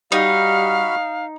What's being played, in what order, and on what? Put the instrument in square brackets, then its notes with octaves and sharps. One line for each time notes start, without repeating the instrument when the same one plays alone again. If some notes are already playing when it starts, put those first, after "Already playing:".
[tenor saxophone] G3 [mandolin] D#4 [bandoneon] F#4 B5 F6 [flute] F5